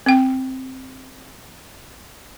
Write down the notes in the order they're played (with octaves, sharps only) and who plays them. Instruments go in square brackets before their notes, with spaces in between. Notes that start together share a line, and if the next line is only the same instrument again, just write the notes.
[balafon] C4 G5